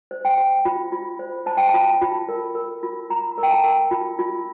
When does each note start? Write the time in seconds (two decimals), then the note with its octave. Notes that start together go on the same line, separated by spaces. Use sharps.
0.11 C5
0.25 G5
0.38 C5
0.65 F4
0.92 F4
1.19 C5
1.46 C5 A5
1.57 G5
1.69 A5
1.74 F4
2.02 F4
2.29 A#4
2.55 A#4
2.83 F4
3.10 F4 A#5
3.38 A#4
3.43 G5
3.51 A5
3.64 A#4
3.91 F4
4.19 F4